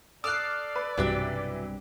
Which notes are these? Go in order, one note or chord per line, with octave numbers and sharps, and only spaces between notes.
A4 D5 D6 D#6 F6 F#6 C7
B4
B1 G2 C3 E3 F#3 D4 G4 B5